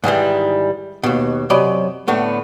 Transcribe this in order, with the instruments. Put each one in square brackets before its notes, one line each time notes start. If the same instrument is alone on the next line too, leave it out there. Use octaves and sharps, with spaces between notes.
[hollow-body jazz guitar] G#2 D#3 E3 G3
D#2 B2
F#2 C3 F#3 D5 D#5 B5
A2 D3 A3 B3